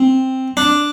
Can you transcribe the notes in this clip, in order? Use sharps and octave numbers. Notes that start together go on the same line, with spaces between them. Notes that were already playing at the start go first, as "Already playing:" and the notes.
Already playing: C4
D4